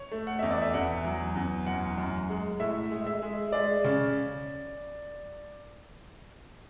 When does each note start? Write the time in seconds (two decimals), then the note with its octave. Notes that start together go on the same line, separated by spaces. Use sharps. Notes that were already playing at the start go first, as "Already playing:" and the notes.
Already playing: C#5
0.11 A3
0.27 F#5
0.39 E2 E5
0.50 D5
0.62 E5
0.74 E2 F#5
1.05 F#3
1.36 E2
1.66 F#2 F#5
1.98 F#2
2.29 G#3
2.59 A2 E5
2.91 G#3
3.07 E5
3.22 G#3
3.52 G#3 D5
3.84 C#3